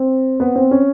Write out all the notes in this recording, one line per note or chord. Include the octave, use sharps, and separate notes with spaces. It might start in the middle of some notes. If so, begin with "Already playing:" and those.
Already playing: C4
B3
C4
C#4